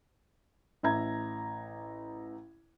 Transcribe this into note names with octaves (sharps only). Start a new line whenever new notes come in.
A1 E5 A#5 G#6